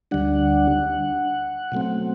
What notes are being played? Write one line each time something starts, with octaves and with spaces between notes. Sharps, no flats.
D2 D3 G3 D4 F#5
B2 F#3 A3 C4